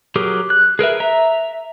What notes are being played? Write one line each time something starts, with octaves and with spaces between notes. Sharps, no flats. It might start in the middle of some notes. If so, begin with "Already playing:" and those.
F#3 G4 G#4 A#4 D6
F#6
G#4 A#4 B4 E5
E5 A#5